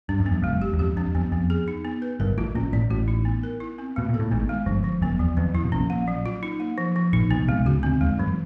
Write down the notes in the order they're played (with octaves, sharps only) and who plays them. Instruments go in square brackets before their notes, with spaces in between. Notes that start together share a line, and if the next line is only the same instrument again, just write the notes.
[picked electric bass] G2 [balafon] D4
[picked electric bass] F#2
[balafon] B3
[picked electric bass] F2
[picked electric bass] F#1 F#2 [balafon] G#3
[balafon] G4
[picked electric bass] E2
[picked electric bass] F2 [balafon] G4
[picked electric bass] F2 [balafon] D4
[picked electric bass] F2 [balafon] B3
[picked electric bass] F2 [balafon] B3
[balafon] G#4
D#4
B3
B4
[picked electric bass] G1 G2 [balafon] A#4
[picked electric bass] A1 A2 [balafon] F4
[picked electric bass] A#1 A#2 [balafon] C#4
[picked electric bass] A1 A2 [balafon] D5
[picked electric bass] A1 A2 [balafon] F#4
[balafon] D#4
B3
A#4
E4
C4
[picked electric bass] B2 [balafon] A3
[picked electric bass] A#2
[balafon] A4
[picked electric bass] A2
[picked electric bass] G#1 G#2 [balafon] B3
[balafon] G#3
[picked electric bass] G1 G2 [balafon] F3
[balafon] F3
[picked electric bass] F#1 F#2 [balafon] B3
[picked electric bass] E2 [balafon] F#3
[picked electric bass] F2 [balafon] D#3
[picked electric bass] F2 [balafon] E4
[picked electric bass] B2
[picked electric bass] A#1 A#2 [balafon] C#4
[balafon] A#3
F#3
F4
D#4
A#3
F3
F3
[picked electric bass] A#1 A#2 [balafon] D#4
[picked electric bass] B1 B2 [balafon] B3
[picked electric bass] C2 C3 [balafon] G#3
[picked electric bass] C#2 C#3 [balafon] F#4
[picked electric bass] D2 D3 [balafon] C4
[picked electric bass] D#2 D#3 [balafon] G#3
[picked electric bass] F#2 F#3 [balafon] E3